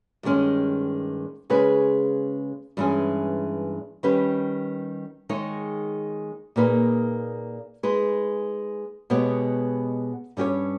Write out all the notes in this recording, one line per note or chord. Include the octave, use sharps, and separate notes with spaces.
G2 D#3 G#3 C#4
C#3 G#3 C#4 G#4 B4
G2 E3 G#3 C#4 G#4
D#3 G3 C#4 G4 B4
D#3 G#3 D#4 G#4 C#5
A#2 A#3 D#4 G#4 B4
G#3 D#4 G#4 B4
B2 G#3 B3 G4 C#5
G2 G3 C#4 G4 C#5